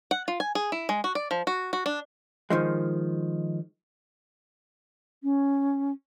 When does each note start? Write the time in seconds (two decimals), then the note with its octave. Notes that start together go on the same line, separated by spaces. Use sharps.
0.11 F#5
0.28 F4
0.40 G#5
0.55 G#4
0.72 E4
0.89 G#3
1.04 F#4
1.15 D5
1.31 F3
1.47 F#4
1.73 F#4
1.86 D4
2.50 D#3 F3 G#3
5.23 C#4